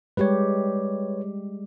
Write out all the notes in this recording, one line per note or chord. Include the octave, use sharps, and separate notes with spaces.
G3 G#3 G4 B4 C#5